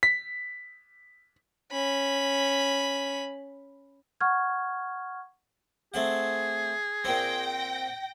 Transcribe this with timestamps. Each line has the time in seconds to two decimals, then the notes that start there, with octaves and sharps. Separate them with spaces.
0.03 B6
1.72 C#4 B5
4.21 F#5 C#6 F6 G#6
5.94 A3 C4 G#4 F#5
7.04 A#2 C4 G5 A#6